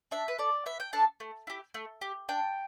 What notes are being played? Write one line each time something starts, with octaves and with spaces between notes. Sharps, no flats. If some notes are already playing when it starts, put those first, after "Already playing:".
D4 E5
B4
A4 D5
B3 E5
G5
D4 A4 A5
A3
E4 G4
A3
G4
D4 G5